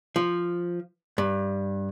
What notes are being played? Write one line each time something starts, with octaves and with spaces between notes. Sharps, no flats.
F3
G2